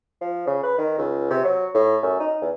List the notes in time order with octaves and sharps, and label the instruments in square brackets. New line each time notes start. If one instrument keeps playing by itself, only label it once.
[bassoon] F3
C#3
B4
D#3
C#2
C3
F#3
A2
F#2
D#4
E2